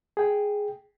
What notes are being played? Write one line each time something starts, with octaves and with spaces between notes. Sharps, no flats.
G#4 G5